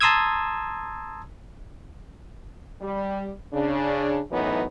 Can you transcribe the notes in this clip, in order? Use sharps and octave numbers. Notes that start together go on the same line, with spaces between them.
A5 A#5 C6 D#6 E6 G#6
G3
C#3 D4
F#2 A2 E3 F#3 B3 D#4